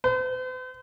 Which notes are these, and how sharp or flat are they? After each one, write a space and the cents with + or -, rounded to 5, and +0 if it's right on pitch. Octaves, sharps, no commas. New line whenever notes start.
C5 -45